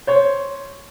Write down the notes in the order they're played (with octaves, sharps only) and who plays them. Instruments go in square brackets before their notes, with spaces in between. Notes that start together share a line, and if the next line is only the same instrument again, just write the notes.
[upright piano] C5 C#5